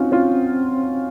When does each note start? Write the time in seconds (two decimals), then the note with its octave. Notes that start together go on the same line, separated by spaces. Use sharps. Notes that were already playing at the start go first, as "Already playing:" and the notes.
Already playing: C4 C#4 D#4 F4 F#4
0.12 C#4 F4